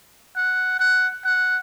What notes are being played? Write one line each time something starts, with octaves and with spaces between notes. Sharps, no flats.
F#5
F#5
F#5